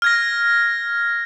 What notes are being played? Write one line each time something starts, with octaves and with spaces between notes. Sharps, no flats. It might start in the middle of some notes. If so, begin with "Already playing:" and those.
F6 G#6 A#6